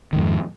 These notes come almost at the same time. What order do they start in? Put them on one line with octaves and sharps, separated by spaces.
D#3 G#2 F2